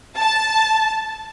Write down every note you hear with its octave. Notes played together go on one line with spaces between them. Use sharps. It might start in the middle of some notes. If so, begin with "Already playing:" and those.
A5